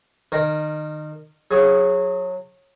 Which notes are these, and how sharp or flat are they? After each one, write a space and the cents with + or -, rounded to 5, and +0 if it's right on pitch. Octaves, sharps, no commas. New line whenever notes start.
D#3 -25 A#4 -5
F#3 -20 G#4 +0